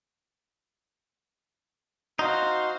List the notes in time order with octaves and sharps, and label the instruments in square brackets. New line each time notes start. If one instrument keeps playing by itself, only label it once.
[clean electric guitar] D#4 [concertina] F#4 C6 [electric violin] C5 F5